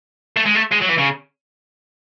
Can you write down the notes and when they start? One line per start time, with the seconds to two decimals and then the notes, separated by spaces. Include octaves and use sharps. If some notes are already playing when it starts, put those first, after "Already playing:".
0.37 A3
0.46 G#3
0.55 A3
0.71 G#3
0.81 F#3
0.88 E3
0.98 C#3